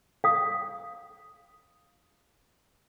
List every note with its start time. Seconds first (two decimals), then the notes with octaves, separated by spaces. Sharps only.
0.24 F5 D#6